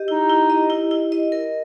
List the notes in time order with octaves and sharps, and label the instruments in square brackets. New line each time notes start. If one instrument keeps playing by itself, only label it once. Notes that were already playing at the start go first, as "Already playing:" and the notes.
Already playing: [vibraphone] G4 D#5
[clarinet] D#4 [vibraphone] E4
[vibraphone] E4
D#5
E4
E4
D#5
A#4